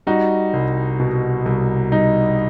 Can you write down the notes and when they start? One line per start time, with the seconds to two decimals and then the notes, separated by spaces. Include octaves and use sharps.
0.07 G3 D#4 F#4
0.53 C2
1.00 B2
1.46 C2
1.92 G3 D#4